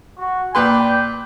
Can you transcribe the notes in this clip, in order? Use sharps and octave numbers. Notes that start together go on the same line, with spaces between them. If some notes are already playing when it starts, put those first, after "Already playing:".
F#4
A#2 B4 D5 G5 C6